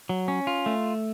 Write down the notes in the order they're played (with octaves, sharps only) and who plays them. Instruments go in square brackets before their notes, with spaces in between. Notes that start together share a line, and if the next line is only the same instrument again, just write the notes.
[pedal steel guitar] F#3
C#4
F4
A3